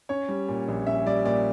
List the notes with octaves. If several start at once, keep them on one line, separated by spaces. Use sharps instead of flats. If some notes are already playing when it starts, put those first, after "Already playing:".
C#4 C#5
G3
A#2
A#1
C#4 E5
G3 D5
A#2 D5